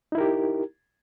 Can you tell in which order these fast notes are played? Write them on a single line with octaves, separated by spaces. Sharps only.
D#4 E4 A#4 G4